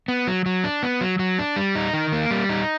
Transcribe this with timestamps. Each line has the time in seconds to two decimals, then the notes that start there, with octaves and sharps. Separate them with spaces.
0.08 B3
0.27 F#3
0.46 F#3
0.64 D4
0.83 B3
1.01 F#3
1.19 F#3
1.39 D4
1.56 G3
1.75 D#4
1.94 D#3
2.12 A#3
2.31 G3
2.49 D#4